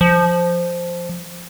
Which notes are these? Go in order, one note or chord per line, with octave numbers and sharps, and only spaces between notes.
F3